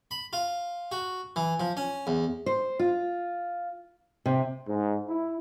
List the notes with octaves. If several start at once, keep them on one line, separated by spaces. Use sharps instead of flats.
B5
F4
F#4
E3
F3
C#4
E2
C5
F4
C3
G#2
E4